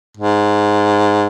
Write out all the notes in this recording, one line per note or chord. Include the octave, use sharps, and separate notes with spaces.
G#2